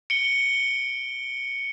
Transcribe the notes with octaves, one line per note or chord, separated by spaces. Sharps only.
C#7 D7 G7